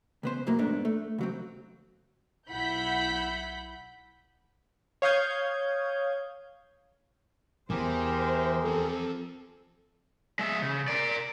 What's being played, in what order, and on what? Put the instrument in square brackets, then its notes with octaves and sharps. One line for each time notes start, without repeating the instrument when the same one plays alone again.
[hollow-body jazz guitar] C#2 B3 C5
B1 F2 A2 F#3 A#3
G#2 A3 B3 D4
A3
C#2 F#3 C4
[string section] B1 E4 F#5 B5 G6 B6
[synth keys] C#5 F5 D#6 G6 G#6
[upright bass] E2 [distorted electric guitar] E3 [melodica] G4 G#4 A#4 [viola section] C5
[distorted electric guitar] F3 C4 [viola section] A4
[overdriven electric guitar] G#3 E5
C#3
A#4 D5